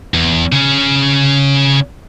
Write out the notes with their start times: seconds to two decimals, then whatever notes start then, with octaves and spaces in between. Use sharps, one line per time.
0.14 E2
0.52 C#3 C#4